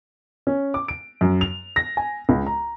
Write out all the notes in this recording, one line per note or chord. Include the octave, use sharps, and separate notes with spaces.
C#4
D6
D7
F#2
F7
A#6
G#5
C#2
A#5